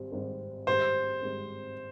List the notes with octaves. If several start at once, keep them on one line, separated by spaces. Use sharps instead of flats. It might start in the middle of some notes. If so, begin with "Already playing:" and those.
Already playing: G#1 G#2 G3 C4 G4
G#1 G#2 G3 C4 G4
G#1 G#2 G3 C4 G4 C5
G#1 G#2 G3 C4 G4